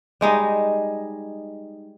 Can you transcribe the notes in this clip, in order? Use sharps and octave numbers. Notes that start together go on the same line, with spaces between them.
G3 G#3 D#4